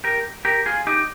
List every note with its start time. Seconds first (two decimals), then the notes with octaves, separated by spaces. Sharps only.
0.04 G4 A#4
0.45 G4 A#4
0.66 F4 G#4
0.87 D#4 G4